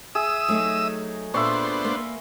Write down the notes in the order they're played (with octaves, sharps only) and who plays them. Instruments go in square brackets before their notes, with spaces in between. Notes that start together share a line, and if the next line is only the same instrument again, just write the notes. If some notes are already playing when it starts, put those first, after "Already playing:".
[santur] G#4 [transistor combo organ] E5 D#6 E6
[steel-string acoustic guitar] F#3 A3 D#4
[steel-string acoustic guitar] A#2 A4 [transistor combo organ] B3 D4 C5 [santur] E5 C6 C#6
[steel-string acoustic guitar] A#3 B4